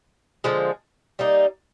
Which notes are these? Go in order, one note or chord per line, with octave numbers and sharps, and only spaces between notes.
D3 F3 G#3
G3 A#3 D#4